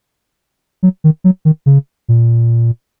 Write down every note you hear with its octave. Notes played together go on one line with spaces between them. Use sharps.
F#3
D#3
F#3
D#3
C#3
A#2